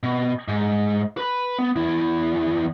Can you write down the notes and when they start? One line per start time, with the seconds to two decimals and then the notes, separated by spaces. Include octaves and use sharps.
0.03 B2
0.48 G#2
1.17 B4 B5
1.59 B3
1.76 E2 E4